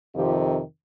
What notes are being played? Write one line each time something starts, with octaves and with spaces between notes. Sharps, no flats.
F2 C3 D#3 F4 G4